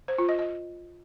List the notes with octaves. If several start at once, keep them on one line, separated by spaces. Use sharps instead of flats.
C5
F4
D#5
D#5